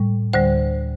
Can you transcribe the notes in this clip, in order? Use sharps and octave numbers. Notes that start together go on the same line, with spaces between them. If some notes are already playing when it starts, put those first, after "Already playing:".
Already playing: A2 G3
D2 D3 G3 C5